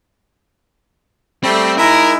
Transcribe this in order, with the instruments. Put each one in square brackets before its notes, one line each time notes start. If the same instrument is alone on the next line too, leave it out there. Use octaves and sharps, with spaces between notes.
[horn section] G3 A3 [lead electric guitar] C4
[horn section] G#3 D#4 E4 [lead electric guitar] A#4